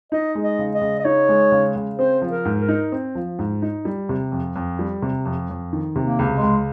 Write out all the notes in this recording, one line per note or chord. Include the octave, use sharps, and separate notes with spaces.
D#4 D#5
G#3
D#5
C#3
D#5
C#3
D#5
D#4 C#5
G#3
C#3
C#3
C4 C5
F3
A#4
G#2
A#4
D#4
C4
F3
G#2
D#4
G3
C3
F2
F2
G3
C3
F2
F2
D#3
C3
A#3
C#2
G#3
C#2